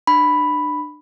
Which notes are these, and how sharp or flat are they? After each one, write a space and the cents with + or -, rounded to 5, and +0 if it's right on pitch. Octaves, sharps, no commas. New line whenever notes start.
D4 +30 B5 +0